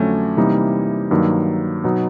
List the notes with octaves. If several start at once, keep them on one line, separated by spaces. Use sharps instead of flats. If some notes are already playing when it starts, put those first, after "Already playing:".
Already playing: F2 D3 F#3 A3 C#4
C3 E3 G3 A#3 D#4
G2 D#3 F#3 A#3 D#4
B2 F#3 B3 D#4